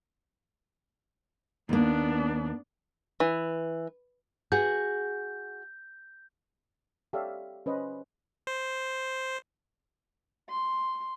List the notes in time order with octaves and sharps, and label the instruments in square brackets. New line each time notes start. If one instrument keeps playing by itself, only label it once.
[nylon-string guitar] D#2 A#3 [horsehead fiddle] B3 D4
[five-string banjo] E3
[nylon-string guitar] F#4 G#4 [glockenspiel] G6
[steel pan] G4 A4 C#5 D5 E5 F5
C#4 B4 C5 D#5
[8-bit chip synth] C5
[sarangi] C6